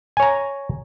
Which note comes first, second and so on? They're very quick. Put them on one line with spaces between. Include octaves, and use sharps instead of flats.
G#5 C#5 A#5